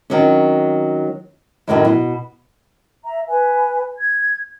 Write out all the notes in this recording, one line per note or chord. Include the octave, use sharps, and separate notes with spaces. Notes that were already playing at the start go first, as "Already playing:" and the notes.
D#3 F#3 C4 C#4
F#2 A2 D3 D#3 F3 F#3
B2
E5 A#5
B4 G#5
G#6